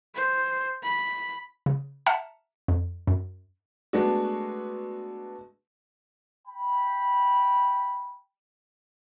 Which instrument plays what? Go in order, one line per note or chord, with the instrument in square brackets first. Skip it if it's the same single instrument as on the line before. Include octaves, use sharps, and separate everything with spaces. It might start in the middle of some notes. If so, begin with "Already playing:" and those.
[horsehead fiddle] C5
B5
[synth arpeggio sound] C#3
E5 F#5 A5 A#5 F6 C#7
F2
F#2
[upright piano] G#3 A3 B3 D4 F#4
[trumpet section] G5 B5